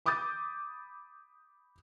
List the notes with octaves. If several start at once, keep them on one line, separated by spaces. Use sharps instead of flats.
B5 D6 D#6 G6 A6